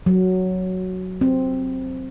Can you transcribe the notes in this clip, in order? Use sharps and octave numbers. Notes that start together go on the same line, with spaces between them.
F#3
C4